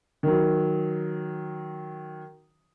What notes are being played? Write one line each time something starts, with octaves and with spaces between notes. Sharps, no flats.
D#3 F#3